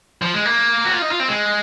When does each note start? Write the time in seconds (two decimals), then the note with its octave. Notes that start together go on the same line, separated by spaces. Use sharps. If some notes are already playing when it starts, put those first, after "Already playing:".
0.22 F3
0.34 G#3
0.46 A#3
0.85 F#4
0.93 F4
1.02 D#4
1.11 F4
1.20 C4
1.28 G#3